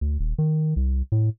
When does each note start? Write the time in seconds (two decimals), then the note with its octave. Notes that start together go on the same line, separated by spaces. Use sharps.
0.01 D2
0.19 D#1
0.38 D#3
0.76 C2
1.12 A2